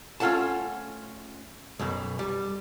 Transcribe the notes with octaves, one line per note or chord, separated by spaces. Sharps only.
A3 C#4 F4 A4 F#5 A5
B1 F#2 B2
G3